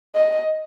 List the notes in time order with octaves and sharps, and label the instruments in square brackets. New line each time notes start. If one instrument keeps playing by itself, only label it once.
[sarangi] D#5